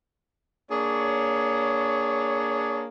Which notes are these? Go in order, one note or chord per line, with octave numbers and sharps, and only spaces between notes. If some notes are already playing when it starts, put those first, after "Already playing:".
A#3 D4 G#4 C#5